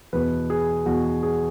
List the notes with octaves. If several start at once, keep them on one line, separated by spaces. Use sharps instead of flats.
E2 B2 B3 B4
G#4
E2 B2 B3 F#4
G#4